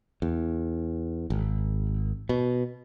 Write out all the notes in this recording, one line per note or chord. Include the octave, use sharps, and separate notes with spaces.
E2
G#1
B2